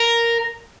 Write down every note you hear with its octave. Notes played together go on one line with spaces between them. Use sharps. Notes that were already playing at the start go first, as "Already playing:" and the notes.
Already playing: A#4